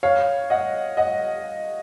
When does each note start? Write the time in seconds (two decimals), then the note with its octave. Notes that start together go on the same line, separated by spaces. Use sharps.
0.03 C#5 F5
0.50 D#5 F#5
0.97 D#5 F#5